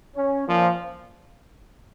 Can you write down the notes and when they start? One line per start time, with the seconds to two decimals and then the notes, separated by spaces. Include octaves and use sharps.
0.15 C#4
0.47 A#2 F3